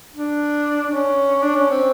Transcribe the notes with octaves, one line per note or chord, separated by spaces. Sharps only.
D4
D4
C#4
D4
C#4
C4